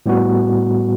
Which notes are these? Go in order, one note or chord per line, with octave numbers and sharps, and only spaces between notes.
A2 G3 B3 F#4